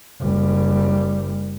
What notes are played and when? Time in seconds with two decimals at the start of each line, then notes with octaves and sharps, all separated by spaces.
0.21 F#1 G3